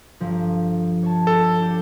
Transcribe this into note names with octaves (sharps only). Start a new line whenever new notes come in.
G1 F3
C#5 A5
A4
D4 G4